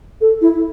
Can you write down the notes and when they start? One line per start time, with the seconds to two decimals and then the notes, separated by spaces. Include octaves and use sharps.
0.21 A4
0.41 E4